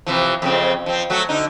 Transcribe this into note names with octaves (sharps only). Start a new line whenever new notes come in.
C3 E3 F3
F2 C#3 C4
F3 C4
F#3 A3 F#4
D3 D#4